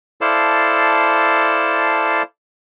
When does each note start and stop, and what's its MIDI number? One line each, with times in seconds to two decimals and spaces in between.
0.21 2.22 64
0.21 2.22 69
0.21 2.22 72
0.21 2.22 74
0.21 2.22 77
0.21 2.22 81